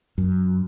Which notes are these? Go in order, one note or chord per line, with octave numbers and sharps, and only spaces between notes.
F#2